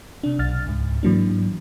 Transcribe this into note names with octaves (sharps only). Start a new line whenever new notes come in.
C3 D4
B1 F6 A6
C#2 G#2
G#2 E3 F#3 A#3 D4